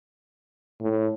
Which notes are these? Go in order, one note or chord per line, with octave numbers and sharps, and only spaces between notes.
A2